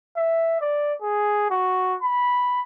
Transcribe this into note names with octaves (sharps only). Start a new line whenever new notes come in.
E5
D5
G#4
F#4
B5